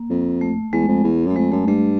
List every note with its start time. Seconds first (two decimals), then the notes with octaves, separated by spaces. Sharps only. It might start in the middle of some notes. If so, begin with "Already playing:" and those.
Already playing: A#3
0.10 F2
0.41 A3
0.73 E2 G#3
0.88 F2
1.04 E2
1.26 F#2 A3
1.36 F2 G#3
1.52 F#2 A3
1.67 G2 A3